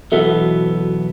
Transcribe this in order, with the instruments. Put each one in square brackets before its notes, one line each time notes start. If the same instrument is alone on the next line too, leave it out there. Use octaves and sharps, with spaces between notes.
[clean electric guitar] B1 E3 B3 [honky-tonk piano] F#4 A4 E5